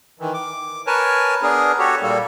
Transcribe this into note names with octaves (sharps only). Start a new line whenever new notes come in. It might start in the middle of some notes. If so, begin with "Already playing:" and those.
D#3 E3
D6
A#4 B4 C#5 G#5 A5
B3 D4 G#4 A#4
F#4 G4 A4 C#5
A#2 G3 A#3 A4